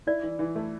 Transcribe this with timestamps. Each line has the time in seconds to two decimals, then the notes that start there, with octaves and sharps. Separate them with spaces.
0.07 E4 D5
0.23 E3
0.39 E3
0.55 A3